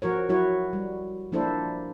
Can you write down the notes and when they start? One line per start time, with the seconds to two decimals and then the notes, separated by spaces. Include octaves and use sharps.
0.02 F3 F#4 A#4 C#5
0.29 F#3 E4 F#4 C#5
0.73 G3
1.32 F3 A#3 D4 E4 A4 C5